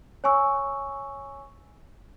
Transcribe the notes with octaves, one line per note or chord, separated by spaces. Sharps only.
C#5 G#5 C#6 E6